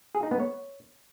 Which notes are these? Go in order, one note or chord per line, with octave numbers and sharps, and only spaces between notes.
G#4
D#4
B3
C#5